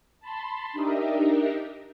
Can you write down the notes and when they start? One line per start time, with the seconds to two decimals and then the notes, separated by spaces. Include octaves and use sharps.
0.20 A5 B5 C6
0.73 D4 D#4 G4 A#4 D#5 E5